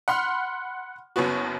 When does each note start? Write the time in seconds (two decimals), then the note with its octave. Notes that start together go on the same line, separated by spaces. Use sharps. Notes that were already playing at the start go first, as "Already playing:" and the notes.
0.08 F#5 B5 C6 F6
1.16 F#1 F#2 B3 F#4